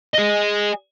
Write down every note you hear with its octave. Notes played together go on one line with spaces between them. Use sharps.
G#4 D#5